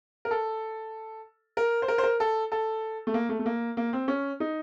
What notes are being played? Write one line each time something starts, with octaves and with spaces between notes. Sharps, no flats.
A#4
A4
A#4
C5
A#4
C5
A#4
A4
A4
A3
A#3
A3
A3
A#3
A#3
C4
C#4
D#4